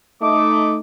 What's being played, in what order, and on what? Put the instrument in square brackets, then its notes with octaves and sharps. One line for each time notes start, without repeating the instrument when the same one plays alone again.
[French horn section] A3 D#4 [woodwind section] D#5 D6